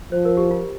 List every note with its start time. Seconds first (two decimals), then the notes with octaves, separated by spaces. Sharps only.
0.12 F3 C5
0.25 A#4
0.37 G4
0.51 F4